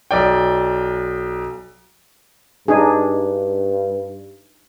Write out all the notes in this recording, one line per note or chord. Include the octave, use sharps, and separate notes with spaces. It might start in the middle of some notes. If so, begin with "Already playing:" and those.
B1 D5 G5
G2 D4 D#4 G#4